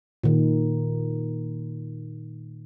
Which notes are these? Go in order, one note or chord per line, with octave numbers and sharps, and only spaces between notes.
A#2 D#3